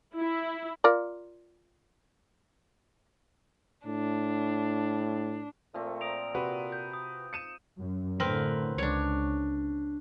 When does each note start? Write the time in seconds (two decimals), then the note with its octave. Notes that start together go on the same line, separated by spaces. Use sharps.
0.17 E4
0.84 F4 A#4 D5
3.86 A2 D4
5.74 A#2 F3 A3 C4
6.01 A#5 D#6 D7 F7
6.34 C3 F#4 B4
6.72 G6
6.93 D#6
7.33 C#7 D#7 E7
7.78 F#2
8.20 A2 D3 C4 A#4 B4
8.78 C#2 D4 C#5